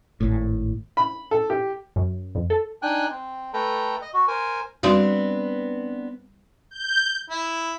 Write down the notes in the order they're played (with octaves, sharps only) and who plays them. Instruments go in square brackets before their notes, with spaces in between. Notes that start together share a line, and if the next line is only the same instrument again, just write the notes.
[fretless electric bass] G#1 A2
[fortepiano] B5
A4
G4
[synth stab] F#2
F2
A4
[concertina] D4 D#4 G5 G#5 F#6
C4
A3 A4 B4 G5 A#5
D#5
F#4
A#4 C5 G#5
[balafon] G3 F#4 C6 [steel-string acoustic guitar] B3 C4 D4
[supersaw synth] G6
[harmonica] E4